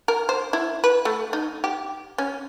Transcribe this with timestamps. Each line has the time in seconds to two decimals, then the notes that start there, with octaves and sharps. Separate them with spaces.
0.08 A#4
0.29 C5
0.53 E4
0.84 B4
1.05 A3
1.33 D#4
1.64 G4
2.18 C#4